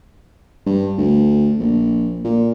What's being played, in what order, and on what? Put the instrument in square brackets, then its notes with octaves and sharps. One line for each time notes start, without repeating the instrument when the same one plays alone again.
[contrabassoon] G2
D2
A#1
A#2